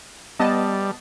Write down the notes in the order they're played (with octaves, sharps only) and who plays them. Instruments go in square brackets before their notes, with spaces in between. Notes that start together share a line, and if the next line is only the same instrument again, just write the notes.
[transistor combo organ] G3 [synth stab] B3 D#5 A5